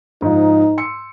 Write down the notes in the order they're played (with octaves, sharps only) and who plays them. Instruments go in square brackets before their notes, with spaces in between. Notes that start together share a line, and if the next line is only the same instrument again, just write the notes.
[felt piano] G#2 F3 [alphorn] D#4
[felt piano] C6 E6 C#7